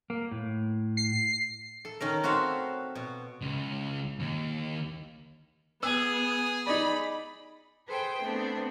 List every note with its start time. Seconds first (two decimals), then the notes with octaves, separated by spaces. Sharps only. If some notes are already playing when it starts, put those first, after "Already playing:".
0.10 A#3
0.31 A2
0.97 C7
1.85 A4
2.00 D#3 C#4 A#4
2.24 C4 F#4 A4 E5 F5
2.95 B2
3.41 C#2
4.19 D#2
5.83 B3 G#4 B4 E6
6.67 D#4 D5 B5
7.89 G#4 A4 B4 C5 G5
8.20 A3 B3 C4 D4